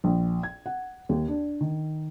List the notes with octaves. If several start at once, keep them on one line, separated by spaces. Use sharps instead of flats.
A#1
G#6
F#5
D#2
D4
D#3